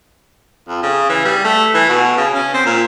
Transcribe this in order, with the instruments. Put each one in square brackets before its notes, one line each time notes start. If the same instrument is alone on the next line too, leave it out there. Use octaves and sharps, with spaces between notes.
[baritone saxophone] F2
C#3
E3
G3
A3
E3
B2
C#3
C#4
C4
A#2